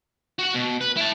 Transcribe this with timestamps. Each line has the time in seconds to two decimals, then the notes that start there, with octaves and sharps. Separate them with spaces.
0.39 F#4 F#5
0.54 B2
0.81 B4
0.96 E4 A5